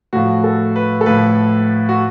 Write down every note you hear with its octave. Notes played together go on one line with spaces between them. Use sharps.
A2 F3 F#4
A4
B4
A4
A2 F3 B4
F#4